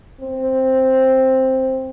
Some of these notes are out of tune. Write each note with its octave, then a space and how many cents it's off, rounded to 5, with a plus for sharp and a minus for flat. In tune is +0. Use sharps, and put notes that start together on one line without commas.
C4 +5